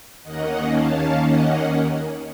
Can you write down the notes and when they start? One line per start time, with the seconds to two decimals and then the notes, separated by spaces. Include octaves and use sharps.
0.23 D#2 D#3 A#3 C#4 D#5 F#5
0.72 F5 A5
1.21 D#5 F#5